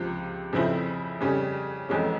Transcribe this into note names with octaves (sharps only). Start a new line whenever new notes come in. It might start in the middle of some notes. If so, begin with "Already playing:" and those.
Already playing: C#2 C3 F3
F2 C#3 F3 C4 E4
F2 C#3 G3 C#4
F1 F2 E3 G#3 C#4